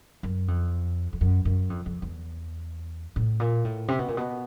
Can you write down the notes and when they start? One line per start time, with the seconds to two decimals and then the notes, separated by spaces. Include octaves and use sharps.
0.23 F#2
0.48 F2
1.13 F2
1.21 F#2
1.45 F#2
1.70 F2
1.86 F2
2.02 E2
3.16 A2
3.40 A#2
3.65 A2
3.88 C3
3.99 B2
4.08 A#2
4.17 B2